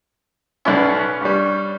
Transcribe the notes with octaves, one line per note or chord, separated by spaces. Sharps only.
B1 C#4 B4 D5 E5 F#5
G2 G3